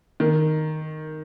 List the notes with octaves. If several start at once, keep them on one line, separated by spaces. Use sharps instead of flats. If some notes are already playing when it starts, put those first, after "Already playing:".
D#3